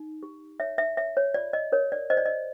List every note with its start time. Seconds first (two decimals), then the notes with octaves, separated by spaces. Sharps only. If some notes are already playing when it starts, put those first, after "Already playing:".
Already playing: D#4
0.23 G4
0.60 C#5 E5
0.78 E5
0.97 C#5 E5
1.17 C#5
1.34 F4 D5
1.53 D#5
1.72 A#4 C#5
1.92 D5
2.10 C5 D#5
2.17 D5
2.26 D#5